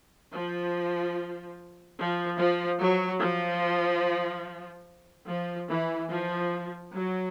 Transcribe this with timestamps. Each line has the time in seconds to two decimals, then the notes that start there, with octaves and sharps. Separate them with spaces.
0.32 F3
1.97 F3
2.39 F3
2.80 F#3
3.21 F3
5.28 F3
5.69 E3
6.11 F3
6.93 F#3